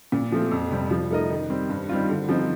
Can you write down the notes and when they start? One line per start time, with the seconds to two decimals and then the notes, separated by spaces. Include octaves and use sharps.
0.12 A#2
0.32 F3 A3 C4
0.51 F2
0.71 C3 G3 C4
0.91 F3
1.10 A3 D#4 A#4 D#5
1.30 D#3
1.50 G3 C4
1.70 G2
1.89 D#3 G3 C4 F4
2.09 D3
2.29 F3 C4 D#4